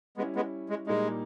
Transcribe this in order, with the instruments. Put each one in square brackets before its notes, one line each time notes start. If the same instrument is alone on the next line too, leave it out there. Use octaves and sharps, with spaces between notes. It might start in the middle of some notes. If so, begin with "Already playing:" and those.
[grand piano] G3 C#4 E4 [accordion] G#3 B3
[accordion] G#3 B3
G#3
[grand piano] A#2 G3 A#3 D#4 [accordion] G#3